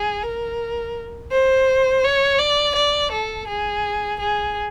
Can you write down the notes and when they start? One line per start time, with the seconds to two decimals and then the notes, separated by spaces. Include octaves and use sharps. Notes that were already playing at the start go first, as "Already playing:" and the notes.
Already playing: G#4
0.23 A#4
1.31 C5
2.04 C#5
2.39 D5
2.75 D5
3.11 A4
3.48 G#4
4.20 G#4